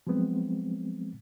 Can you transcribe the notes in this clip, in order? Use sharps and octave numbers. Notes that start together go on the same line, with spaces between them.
F3 F#3 G#3 B3 C4